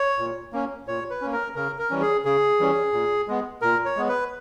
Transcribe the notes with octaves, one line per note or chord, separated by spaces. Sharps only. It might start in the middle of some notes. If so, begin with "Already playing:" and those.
Already playing: C#5
A#2
A#3 C#4
A#2 C#5
B4
A#3 C#4
A#4
C#3 A#4
A#4
E3 G3 C#4
G#4
C#3 G#4
E3 G3 C#4
A#2
G#3 B3
A#2 A#4
C#5
G#3 B3
B4